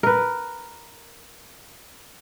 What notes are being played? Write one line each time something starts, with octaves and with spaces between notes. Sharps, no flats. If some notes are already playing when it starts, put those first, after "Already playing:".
A#4 B4